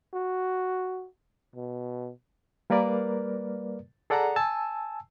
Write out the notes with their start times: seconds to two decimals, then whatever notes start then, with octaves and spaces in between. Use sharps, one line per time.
0.14 F#4
1.55 B2
2.70 G3 A#3 A#4 B4 D5
4.10 G#4 A4 D5 F#5 A5 A#5
4.36 G#5 A5 E6